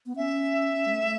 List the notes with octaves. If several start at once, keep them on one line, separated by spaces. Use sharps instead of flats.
B3
C#4 E5
G#3
A3